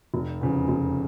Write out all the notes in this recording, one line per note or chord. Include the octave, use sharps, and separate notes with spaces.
F1
E2 C#3 F3
F1